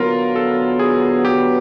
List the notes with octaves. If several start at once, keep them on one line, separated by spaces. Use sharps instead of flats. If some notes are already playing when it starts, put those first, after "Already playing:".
Already playing: D3 F#3 B3 F4 A#4
A4
G#4
G4